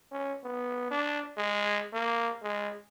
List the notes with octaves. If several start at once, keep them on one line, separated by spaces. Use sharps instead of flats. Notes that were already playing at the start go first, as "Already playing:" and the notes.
C#4
B3
D4
G#3
A#3
G#3